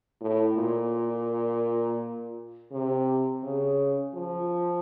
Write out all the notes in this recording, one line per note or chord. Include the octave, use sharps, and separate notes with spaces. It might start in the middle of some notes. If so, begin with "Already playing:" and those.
A2
A#2
C3
C#3
F3